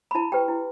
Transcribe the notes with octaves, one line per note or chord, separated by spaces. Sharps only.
B5
E4 A5
G4 B4 G5
E4